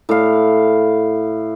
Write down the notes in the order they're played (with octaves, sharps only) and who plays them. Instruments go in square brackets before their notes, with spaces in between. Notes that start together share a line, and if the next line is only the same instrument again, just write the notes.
[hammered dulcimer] A2 F5